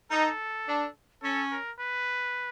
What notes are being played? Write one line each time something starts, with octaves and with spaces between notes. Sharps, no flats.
D#4 A4
D4
C#4 A4
A#4
B4